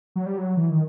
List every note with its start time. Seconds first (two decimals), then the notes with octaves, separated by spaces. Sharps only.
0.16 F#3
0.26 G3
0.38 F#3
0.57 E3
0.70 D#3